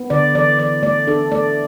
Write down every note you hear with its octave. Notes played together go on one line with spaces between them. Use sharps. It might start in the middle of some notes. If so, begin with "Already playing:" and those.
Already playing: B3
D3 D5
E3 D5
E3 D5
A3 D5
D4 A4
A3 D5